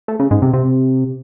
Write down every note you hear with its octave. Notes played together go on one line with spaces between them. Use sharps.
A3
C#3
G#2
C3
C3